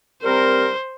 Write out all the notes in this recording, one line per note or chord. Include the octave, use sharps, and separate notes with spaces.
G3 C4 A#4 C5